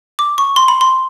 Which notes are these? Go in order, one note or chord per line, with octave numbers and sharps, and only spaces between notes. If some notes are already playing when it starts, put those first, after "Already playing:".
D6
C#6
C6
B5
C6